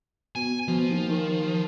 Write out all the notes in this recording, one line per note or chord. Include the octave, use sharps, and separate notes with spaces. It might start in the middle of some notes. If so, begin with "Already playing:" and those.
B2 G#5
B2 F3
D#2
D#3